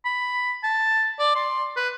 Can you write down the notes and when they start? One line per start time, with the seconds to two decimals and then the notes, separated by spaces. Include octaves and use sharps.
0.05 B5
0.63 A5
1.19 D5
1.36 C6
1.76 B4